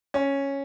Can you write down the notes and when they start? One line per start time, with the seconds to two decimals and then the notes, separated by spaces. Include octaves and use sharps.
0.14 C#4